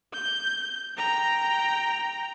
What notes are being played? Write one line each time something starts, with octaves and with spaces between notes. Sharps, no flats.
G6
G5 A#5